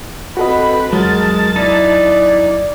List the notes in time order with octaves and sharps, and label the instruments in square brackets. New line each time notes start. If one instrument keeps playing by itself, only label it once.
[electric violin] C4 B5 [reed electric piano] F#4 A4 D#5 [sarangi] B4
[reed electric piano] E2 F#3 [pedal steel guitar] G#3 [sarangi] A#4 [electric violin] A5 A6
[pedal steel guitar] D#4 E4 [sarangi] D5